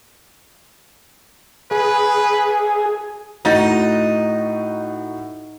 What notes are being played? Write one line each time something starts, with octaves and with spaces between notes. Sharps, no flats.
G#4 B4
A2 D#4 F#4 A6